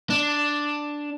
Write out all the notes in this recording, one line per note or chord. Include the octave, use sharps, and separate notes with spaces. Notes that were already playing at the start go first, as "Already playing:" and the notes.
D4